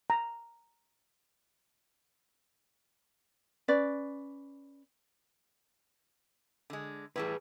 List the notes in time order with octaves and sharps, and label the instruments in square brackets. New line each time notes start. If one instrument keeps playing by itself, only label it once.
[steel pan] A#5
[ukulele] C#4 B4 D5
[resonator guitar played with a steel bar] D3 G#3
[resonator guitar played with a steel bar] A2 E3 G3 [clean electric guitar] G#4 B4